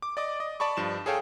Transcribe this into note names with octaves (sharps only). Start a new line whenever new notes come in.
D6
D5 D#5 D6
D#5
D5 A5 B5 C#6
G2 F3 E7
G#4 A4 C#5 F5 G5